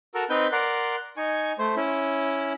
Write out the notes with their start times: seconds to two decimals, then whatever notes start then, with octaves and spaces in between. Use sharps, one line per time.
0.14 F#4 A4 A#4
0.30 C4 D#4 B4 G6
0.52 A#4 D5 F#5 C6
1.17 D#4 G#5 C#6
1.59 A3 C5
1.76 C#4 E4